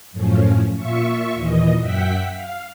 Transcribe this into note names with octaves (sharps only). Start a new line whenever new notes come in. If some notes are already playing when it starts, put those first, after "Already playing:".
F#2 A2 F3 C#4
A#2 F4 E5 C#6
D#2 A#2 E3 D#5
F#2 E5 F#5 G5 B6
F5